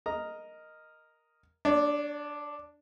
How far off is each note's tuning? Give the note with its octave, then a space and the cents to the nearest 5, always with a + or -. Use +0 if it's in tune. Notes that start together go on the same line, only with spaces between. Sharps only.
A#4 +0 D#5 +0 A#5 +0
D4 +0 C#5 +45